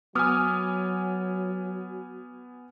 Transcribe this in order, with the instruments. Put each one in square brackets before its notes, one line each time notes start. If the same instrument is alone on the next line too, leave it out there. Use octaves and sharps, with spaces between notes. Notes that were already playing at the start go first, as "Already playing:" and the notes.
[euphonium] F#3 [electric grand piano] B3 G#5 [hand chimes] D6 D#6 F6